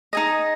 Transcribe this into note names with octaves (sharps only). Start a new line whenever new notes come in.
D#4 G#4 D#5